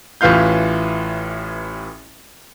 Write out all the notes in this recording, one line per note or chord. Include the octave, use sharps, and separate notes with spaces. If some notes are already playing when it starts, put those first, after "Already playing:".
A1 A2 E3 F4 F5 G6